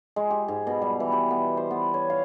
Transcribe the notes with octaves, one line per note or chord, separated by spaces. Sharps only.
G#3
G4
G#2
B2
G3
E3
G4
B3
C5
B3
C#5
F5